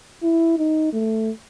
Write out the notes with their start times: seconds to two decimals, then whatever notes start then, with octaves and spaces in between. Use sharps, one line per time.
0.23 E4
0.58 D#4
0.93 A3